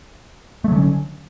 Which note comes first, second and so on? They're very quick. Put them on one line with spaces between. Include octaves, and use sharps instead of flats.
A3 F#3 D3 C#4